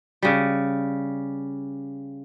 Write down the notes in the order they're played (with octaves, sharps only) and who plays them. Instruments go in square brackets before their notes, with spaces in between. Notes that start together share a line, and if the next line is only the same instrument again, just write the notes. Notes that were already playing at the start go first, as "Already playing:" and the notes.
[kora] C#3 G3